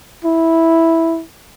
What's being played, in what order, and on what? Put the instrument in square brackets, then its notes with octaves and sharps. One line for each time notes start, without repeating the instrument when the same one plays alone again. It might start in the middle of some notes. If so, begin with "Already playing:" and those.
[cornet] E4